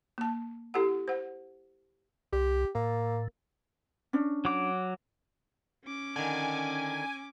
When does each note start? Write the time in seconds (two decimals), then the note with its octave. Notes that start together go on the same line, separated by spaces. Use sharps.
0.18 A#3 A5
0.74 E4 G4 A4 F#5
1.08 C5 F#5
2.33 C2 G4
2.75 A2 A#3
4.13 C#4 D4
4.45 F#3 D6
5.84 C#4 D6
6.16 D3 D#3 G#5